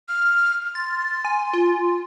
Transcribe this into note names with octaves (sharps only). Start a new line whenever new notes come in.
F6
C6 A6
G#5
F4